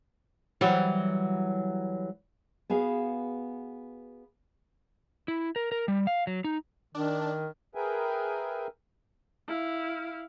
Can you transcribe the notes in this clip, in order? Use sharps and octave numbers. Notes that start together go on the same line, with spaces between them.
E3 F#3 G3
B3 F#4 G#4 F5
E4
A#4
A#4
G3
F5
F#3
D#4
D#3 D4
G#4 A#4 B4 E5 G5 G#5
E4 F5